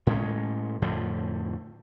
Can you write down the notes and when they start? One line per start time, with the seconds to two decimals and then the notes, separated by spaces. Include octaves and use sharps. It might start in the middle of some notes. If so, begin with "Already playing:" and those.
0.07 A2 G#3 C#4
0.82 F2 A2 D3 F3